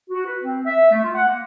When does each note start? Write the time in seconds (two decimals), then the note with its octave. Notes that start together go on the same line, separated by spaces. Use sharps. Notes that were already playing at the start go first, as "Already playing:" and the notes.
0.10 F#4
0.27 B4
0.43 C4
0.66 E5
0.91 A3
1.03 F4
1.15 F#5
1.27 A#3